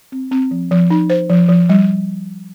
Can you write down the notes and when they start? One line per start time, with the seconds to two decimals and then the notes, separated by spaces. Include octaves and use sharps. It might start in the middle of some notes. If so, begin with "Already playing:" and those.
0.12 C4
0.32 C4
0.51 F3
0.71 F3
0.90 D#4
1.10 C5
1.30 F3
1.49 F3
1.69 G3